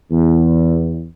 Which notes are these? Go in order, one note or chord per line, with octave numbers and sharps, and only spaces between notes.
E2